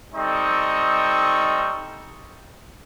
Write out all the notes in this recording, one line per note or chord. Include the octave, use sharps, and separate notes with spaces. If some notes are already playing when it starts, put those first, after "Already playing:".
G3 C4 D#4 A4 D#5 C#6